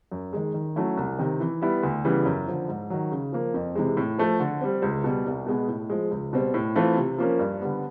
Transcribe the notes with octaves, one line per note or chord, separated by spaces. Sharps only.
F#2
D#3 G#3
D#3
F#3 A3 C#4 E4
C2
C3 D#3
E3
G3 B3 E4
D2
C#3 E3 G3 B3
F#2
D3 F3
G#2
D#3 F#3
C#3
F3 A#3
F2
C3 E3 G#3
A2
F3 A3
D3
G3 C4
C#2
B2 G3
C2
B2 G#3 B3
A2
F3 G#3
C#2
B2 G3 C4
A2
E3 A3 C4 F4
C3
F3 A#3 C#4
G2
D3 G3 B3